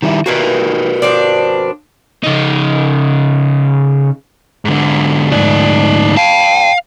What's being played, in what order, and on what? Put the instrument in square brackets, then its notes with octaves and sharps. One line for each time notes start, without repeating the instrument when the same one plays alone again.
[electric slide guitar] D#3 G3 E4
[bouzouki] D#3 E3 A#3 [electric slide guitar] F#4 A#4 B4
[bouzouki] F3 C4 D4
[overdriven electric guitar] C#3 D#4
[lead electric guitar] G#2 D3
[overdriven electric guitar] D2 G#2 [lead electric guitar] D#4 D5
[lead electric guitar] F5 [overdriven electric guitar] G5 A5